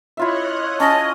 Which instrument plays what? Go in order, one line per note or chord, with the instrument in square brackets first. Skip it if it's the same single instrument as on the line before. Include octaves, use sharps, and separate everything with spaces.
[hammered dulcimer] E4 F4 E5 [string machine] C#5 D#5 F#6
[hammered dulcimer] C#4 [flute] D#5 [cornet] A5 [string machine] D#6